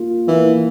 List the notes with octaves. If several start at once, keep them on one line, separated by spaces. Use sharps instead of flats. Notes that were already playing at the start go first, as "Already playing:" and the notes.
Already playing: A#3 F4
E3 A#3